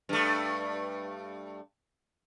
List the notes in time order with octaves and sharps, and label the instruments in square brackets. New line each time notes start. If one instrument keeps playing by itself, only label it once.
[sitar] G2 A3